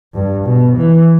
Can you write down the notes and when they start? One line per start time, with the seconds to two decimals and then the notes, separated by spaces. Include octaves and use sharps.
0.14 G2
0.45 B2
0.77 E3